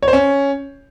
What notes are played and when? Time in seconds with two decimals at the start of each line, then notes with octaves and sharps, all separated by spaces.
0.03 C#5
0.08 C5
0.13 C#4